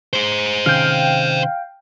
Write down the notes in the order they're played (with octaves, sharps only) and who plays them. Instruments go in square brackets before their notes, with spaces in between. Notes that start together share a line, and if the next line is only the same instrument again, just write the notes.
[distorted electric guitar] G#4 C5
[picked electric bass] C3 D#3 C#4 [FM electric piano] F5 G5